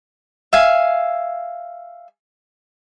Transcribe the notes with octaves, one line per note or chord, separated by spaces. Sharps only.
E5 F5 G#5